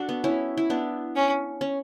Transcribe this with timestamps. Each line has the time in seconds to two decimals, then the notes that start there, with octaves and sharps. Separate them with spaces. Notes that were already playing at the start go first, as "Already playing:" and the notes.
Already playing: D4 F#4 A4
0.09 B3
0.24 C#4 E4
0.57 E4
0.70 B3 D4
1.16 C#4
1.61 C#4